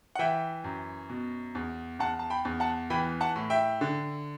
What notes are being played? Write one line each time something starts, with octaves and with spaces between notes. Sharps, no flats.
F#5
E3 E5 G5
F#2
B2
E2
E2 F#5 A5
A5
G5 B5
E2
F#5 A5
E3 G5 B5
F#5 A5
A2
E5 G5
D3